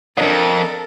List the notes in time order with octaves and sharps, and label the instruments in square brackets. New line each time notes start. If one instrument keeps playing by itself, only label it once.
[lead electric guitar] F2 G#2 [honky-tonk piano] C4 D4 D#5 [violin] A4 A#4